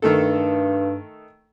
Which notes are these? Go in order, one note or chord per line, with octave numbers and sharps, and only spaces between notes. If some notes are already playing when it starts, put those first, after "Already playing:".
G2 D#3 A3 A4